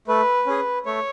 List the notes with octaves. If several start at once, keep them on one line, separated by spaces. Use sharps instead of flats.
A3 B4
C#4 G#4
A3 C#5